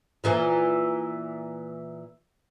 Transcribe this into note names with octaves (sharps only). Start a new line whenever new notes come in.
A#2 E3 A#3